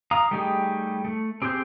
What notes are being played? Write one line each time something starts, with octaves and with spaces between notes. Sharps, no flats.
F5 A#5 D#6
G3 A3 D#4 G4 G#4
A3
C4 G4 G#4 C5 G6